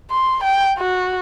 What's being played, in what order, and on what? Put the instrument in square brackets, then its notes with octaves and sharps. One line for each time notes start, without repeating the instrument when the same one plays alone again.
[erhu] C6
G5
F#4